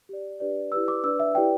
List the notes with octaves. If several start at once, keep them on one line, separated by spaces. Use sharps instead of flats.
G4 D5
D4 G4 B4 D5
E4 G4 B4 D5 E6
D6
D4 B4 D5 E6
E5
E4 G4 B4 D5 G5